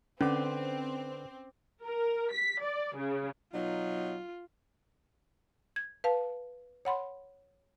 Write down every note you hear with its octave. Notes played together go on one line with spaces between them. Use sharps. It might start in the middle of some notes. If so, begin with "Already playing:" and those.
D3 C4 C#4 B4 D6
A#4
B6
D5
C#3
B2 F#3 D#4 F4
G#6
B4 F5 A5
C#5 F#5 B5 C6